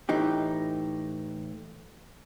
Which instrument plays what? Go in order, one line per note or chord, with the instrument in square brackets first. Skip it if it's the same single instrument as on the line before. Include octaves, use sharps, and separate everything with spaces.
[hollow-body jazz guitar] A2 E3 D#4 G4